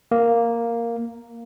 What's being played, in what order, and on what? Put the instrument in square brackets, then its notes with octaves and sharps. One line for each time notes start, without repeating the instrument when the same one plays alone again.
[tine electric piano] A#3